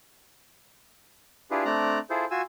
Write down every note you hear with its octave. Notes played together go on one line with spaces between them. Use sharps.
D4 E4 F4 G4 G#4 B4
A3 C4 D4 D5 A#5 F#6
E4 F4 G#4 A4 C5
F4 F#4 G#5 E6